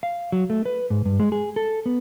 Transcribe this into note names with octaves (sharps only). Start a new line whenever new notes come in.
F5
F#3
A3
B4
G#2
G2
G#3
G#4
A4
B3